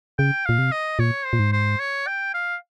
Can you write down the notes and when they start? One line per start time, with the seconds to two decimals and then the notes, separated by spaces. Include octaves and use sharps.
0.19 C#3 G5
0.46 A#2 F5
0.58 C3
0.72 D#5
0.99 A#2 C#5
1.25 C5
1.33 A#2
1.39 G#2
1.53 C5
1.80 C#5
2.07 G5
2.34 F5